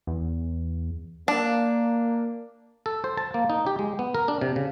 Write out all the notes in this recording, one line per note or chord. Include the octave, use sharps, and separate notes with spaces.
E2
A#3 D4
A4
C5
A5
A#3
D#4
G4
G#3
B3
A#4
D4
C3
C#3